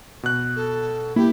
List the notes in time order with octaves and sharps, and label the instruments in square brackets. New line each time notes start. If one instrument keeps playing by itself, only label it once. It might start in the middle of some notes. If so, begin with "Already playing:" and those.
[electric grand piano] B2 F#6
[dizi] A4
[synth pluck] A#3 [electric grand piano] E4 [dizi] G4